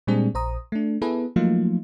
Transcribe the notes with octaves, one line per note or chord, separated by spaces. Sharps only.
A#2 G3 G#3 C4 D4 G#4
A#1 C5 A#5 D#6
A3 D4
B3 E4 G#4 A4 B4
F3 F#3 A3 A#3 D#4 F4